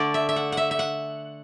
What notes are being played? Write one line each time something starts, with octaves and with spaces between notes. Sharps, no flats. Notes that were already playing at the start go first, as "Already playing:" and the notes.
Already playing: D3 A3 D5
E5
E5
F#5
E5 F#5
E5
F#5